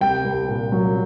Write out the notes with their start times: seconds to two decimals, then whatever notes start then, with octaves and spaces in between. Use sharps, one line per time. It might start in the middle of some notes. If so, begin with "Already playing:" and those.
0.01 C2 G5
0.24 C2
0.49 A#2
0.72 F#3